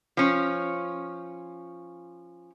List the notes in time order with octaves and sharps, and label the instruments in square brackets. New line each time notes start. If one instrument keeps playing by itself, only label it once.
[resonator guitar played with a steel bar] F3 C#4